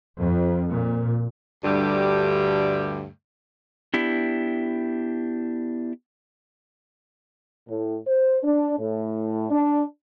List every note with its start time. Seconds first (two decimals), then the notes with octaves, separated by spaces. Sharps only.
0.18 F2
0.70 A#2
1.65 D2 G2 D3 G3 A3 G4
3.94 B3 D4 E4 G4
7.68 A2
8.06 C5
8.43 D4
8.78 A2
9.51 D4